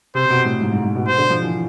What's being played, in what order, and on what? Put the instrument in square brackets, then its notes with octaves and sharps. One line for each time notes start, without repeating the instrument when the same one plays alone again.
[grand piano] C3 [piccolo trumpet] C5
[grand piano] C3
B2
A2
G#2
G#2
G#2
B2
[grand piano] B2 [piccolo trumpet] C5
[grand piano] D3
F3
E3